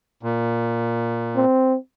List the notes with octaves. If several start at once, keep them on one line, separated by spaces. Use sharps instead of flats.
A#2
C4